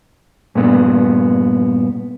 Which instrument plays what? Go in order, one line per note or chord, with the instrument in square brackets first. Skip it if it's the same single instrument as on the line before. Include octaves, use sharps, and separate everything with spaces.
[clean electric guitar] G2 A#2 B3